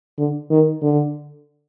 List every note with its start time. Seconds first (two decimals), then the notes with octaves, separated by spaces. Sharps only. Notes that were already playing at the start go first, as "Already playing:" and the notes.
0.18 D3
0.51 D#3
0.82 D3